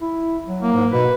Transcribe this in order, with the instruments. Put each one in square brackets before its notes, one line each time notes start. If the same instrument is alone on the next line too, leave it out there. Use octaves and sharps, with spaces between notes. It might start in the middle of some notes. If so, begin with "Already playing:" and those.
[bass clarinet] E4
F#3
[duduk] A#3
[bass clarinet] G#2
[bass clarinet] B2 [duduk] B4